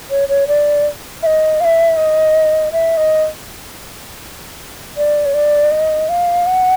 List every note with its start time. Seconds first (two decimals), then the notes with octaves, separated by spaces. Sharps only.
0.10 C#5
0.28 C#5
0.48 D5
1.23 E5
1.26 D#5
1.60 F5
1.64 E5
1.97 D#5
2.72 E5
2.97 D#5
4.97 D5
5.25 C#5
5.34 D5
5.71 D#5
6.09 F5
6.46 F#5